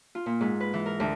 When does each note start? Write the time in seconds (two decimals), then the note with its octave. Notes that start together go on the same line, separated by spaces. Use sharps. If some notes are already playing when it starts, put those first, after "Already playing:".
0.15 F4
0.26 A#2
0.41 G#2
0.60 B4
0.74 E3
0.86 A#4
1.00 D2